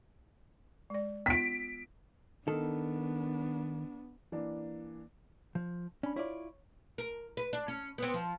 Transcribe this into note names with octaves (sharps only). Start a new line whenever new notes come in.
G#3 D5
B3 F4 B6 D7
D#3 B3 D4 A4
E3 A#3 D4
F3
C#4 D4 B5
E4 F4 C#5 D5
A#4
B4
D4
C#4
B3 C4
F3